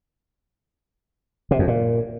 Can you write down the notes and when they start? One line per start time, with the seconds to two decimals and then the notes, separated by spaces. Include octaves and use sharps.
1.51 C3
1.59 F2
1.67 A#2